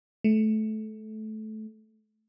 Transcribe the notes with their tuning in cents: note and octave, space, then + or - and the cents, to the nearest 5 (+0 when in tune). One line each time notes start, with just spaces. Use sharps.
A3 -20